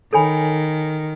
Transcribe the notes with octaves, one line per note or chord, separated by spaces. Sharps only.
D#3 A4 C#5 G#5 B5